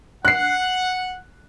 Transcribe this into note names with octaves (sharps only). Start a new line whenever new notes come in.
F#5 F#6 C7